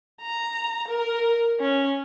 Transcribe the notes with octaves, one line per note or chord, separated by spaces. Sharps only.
A#5
A#4
C#4